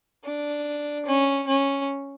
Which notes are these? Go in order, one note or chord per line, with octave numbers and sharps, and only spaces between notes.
D4
C#4
C#4